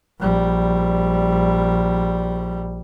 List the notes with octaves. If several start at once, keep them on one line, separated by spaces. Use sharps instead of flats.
A#1 G3